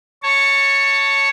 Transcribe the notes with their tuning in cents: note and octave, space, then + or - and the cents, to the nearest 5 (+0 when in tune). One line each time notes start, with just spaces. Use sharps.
C#5 +0 A5 +20